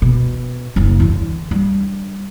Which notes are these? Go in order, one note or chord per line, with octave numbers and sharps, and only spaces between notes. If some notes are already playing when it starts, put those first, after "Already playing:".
B2
F#1 D#2
E2 D3
G3 D4